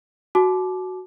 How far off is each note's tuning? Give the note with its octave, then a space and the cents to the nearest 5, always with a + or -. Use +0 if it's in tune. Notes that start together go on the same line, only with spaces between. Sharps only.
F#4 +0 A5 -35 D6 +5